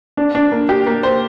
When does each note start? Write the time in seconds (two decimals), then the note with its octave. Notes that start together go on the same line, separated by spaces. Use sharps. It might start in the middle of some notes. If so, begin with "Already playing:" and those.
0.17 D4
0.35 D4
0.52 A#3
0.69 G4
0.87 A#3
1.03 C5